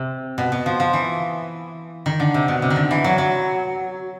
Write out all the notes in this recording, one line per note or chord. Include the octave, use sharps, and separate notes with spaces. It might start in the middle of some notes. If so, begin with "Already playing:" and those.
Already playing: C3
B2
B2
F3
F3
E3
D#3
D3
C3
B2
C3
D#3
D3
E3
F#3
F#3